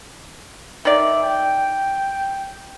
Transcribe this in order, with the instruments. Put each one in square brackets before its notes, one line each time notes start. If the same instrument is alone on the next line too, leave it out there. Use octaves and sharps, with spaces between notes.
[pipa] D#3 D5 [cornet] E5
[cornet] G5